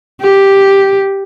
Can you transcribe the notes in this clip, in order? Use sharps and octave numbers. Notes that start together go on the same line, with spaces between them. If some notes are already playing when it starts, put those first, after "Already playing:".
G4